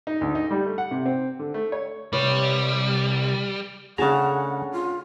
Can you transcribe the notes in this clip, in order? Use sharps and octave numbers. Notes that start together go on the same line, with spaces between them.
D#4
D2
D#4
G3
A3
F#5
C3
C4
D3
A3
C#5
C2 G3 B4 C#5
C#3 A3 C#4 D4 G#4 F#5 A5 A#5
F4